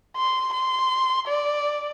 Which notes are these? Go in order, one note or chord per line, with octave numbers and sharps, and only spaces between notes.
C6
C6
D5